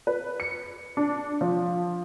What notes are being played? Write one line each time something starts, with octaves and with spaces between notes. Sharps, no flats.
B4
C#7
D4
F3